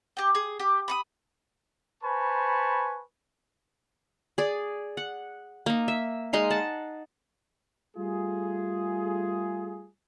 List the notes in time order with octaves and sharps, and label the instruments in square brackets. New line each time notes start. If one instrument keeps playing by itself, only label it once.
[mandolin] G4 G5
G#4
G4
B5 C#6 D#6
[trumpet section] B4 C5 G#5 A5 B5 C#6
[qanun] G#4 D5
F#5
A#3 D#4
E5
G#3 D#4 F5 C6
F#5 A5
[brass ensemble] G3 A3 F4 G#4